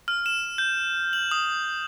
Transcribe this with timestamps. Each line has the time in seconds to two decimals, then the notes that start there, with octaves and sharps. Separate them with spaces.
0.08 F6
0.26 E7
0.58 G6
1.13 F#7
1.31 D#6